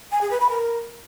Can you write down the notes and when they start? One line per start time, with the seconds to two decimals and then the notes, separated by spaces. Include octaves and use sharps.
0.12 G#5
0.21 G#4
0.31 B4
0.40 B5
0.50 A#4